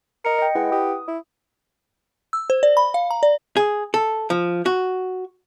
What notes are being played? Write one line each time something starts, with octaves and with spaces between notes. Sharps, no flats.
A#4 D#5 C#7
D#5 G5
G#3 E4 B4 F#5
G4 D#6
E4
E6
C5
D5
B5
F5
A#5
D5
G#4
A4
F3
F#4